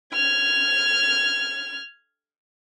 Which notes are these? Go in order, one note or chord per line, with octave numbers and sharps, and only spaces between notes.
F6 G#6